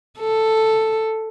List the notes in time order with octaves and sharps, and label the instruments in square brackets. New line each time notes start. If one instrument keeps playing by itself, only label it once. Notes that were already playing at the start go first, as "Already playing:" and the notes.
[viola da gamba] A4